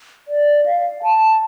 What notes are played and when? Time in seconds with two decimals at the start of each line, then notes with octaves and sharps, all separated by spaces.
0.28 D5
0.66 F5
1.03 A5